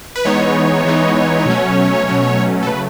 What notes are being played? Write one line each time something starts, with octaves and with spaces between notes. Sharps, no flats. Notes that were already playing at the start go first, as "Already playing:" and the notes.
B4
E3 G#3 B3 D#4 C#5
E3 G#3 B3 D#4
B2 F#3 A3 C#4
B2 F#3 A3 C#4
A4
C#3 F#3 A3 B4